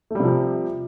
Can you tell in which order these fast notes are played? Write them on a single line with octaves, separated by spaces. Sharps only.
A3 G3 C3 F3